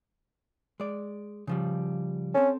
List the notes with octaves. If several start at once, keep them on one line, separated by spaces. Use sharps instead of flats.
G#3 D5
C#3 F3 G3
C4 C#4 A4